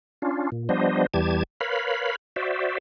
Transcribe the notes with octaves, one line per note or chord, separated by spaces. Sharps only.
C#4 D4 F4
A#2
F3 G3 B3 D4 C5 D#5
E2 E3 G3 G4 A5 G#6
A#4 B4 C#5 F5 B5
F#4 C5 D5 E5